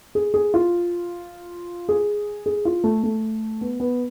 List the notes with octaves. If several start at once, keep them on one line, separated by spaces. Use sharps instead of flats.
G#4
G#4
F4
G#4
G#4
F4
A3
A3
B3
B3